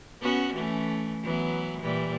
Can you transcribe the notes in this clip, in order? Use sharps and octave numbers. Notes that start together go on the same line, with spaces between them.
B3 C#4 F#4
E3 A3 C#4
E3 F#3 B3
A#2 E3 G3